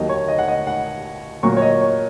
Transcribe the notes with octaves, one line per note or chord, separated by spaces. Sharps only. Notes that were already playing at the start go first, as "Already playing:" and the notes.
Already playing: D#2 D#3 F#3 A#3 D#5
C#5
D#5
F#5
D#5
F#5
A#2 F#3 A#3 C#6
C#5
D#5
C#5